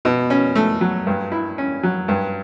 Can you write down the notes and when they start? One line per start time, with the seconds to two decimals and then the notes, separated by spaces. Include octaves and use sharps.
0.05 B2
0.30 C#4
0.55 A3
0.81 F#3
1.07 G2
1.32 E4
1.58 C#4
1.83 F#3
2.08 G2